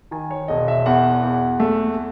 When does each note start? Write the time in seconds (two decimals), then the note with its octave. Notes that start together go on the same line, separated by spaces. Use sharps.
0.11 D#3 G#5
0.31 C#5
0.48 E1 D#5
0.68 E5
0.86 E2 F#5
1.23 E2
1.60 A3